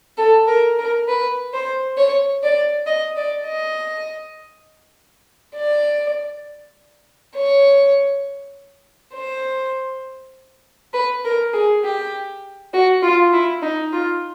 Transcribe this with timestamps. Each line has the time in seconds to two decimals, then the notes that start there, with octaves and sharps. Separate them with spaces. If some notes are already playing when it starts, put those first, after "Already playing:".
0.17 A4
0.47 A#4
0.78 A#4
1.07 B4
1.52 C5
1.97 C#5
2.42 D5
2.86 D#5
3.16 D5
3.46 D#5
5.55 D5
7.35 C#5
9.13 C5
10.93 B4
11.23 A#4
11.52 G#4
11.83 G4
12.73 F#4
13.02 F4
13.33 E4
13.61 D#4
13.92 F4